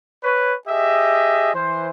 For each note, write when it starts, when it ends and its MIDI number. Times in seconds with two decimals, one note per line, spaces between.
0.24 0.55 71
0.24 0.55 73
0.68 1.53 67
0.68 1.53 68
0.68 1.53 75
0.68 1.53 76
1.54 1.90 52
1.54 1.90 72